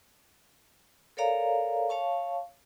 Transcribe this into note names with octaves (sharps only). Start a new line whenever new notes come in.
A4 A#4 C#5 D5 F5 A#5
C#5 F5 A5 C#6